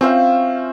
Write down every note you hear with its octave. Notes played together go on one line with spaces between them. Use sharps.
C4 C#4 F4 C5 E5